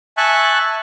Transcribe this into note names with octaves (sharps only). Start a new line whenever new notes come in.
E5 G#5 A5 C#6 F#6